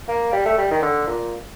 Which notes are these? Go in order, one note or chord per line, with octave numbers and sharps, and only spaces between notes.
A#3
G3
A3
G3
D#3
D3
A#2